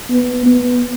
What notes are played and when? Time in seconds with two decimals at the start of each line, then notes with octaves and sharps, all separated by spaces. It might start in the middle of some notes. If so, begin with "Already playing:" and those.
0.10 B3
0.46 B3